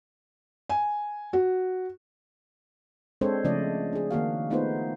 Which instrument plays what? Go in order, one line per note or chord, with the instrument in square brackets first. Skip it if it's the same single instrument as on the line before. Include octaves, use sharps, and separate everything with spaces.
[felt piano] G#5
F#4
[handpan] G#3 C4 D4 A4 C5 C#5
C#3 F3 A3 D4 D5 D#5
D4 G#4
D#3 A#3 F#4 F5
A3 B3 D#4 F4 B4 C5